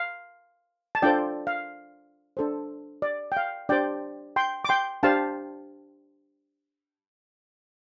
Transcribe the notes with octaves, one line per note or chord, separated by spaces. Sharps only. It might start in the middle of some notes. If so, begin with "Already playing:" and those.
Already playing: F5
A5
D4 F4 A4 C5 D5 G5
F5
D4 A4 C5
D5
G5
F5
D4 G4 C5 D5 G5
G5 C6
D6
G5 C6
D4 G4 C5 F5 A5